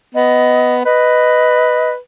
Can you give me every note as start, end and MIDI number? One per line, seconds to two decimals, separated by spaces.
0.15 0.83 59
0.15 0.75 75
0.85 1.97 71
0.85 1.91 75